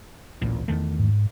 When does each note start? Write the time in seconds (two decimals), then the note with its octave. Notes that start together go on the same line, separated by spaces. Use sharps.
0.42 D1 A1 A#2
0.68 E2 D#3 A3
0.99 G#2